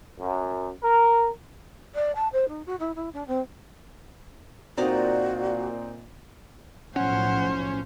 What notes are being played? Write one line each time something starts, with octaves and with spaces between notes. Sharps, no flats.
F#2
A#4
D5
A5
C5
D#4
F#4
E4
E4
D4
C4
A#2 C4 D#4 F#4 D5 D#5 A#5
B1 A2 F3 C#4 C5 F#5